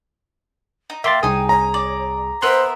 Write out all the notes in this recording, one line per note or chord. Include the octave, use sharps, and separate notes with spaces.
D#4
A#3 E5 G5 C6 A6
C2 D#4 G#4 G#5 D#6
C#5 A#5
D5
B3 A#4 C5 E5 C6 F#6